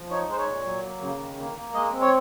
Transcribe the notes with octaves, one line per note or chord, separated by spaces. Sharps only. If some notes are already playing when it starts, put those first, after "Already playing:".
Already playing: F3
D#4 C#5
G#3 C5
C#5
A#2
F#3
A#3
C#3
D#3
A#3
A#3
G#3 D#5
C4
C#5